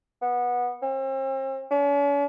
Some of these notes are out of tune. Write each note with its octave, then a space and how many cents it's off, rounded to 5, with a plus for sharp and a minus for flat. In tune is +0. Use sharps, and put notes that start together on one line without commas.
B3 -15
C4 +40
C#4 +45